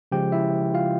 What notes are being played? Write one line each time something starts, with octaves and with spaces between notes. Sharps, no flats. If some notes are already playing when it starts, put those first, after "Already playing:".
C#3 F3 G#3 G4 G5
E4 E5
F4 F5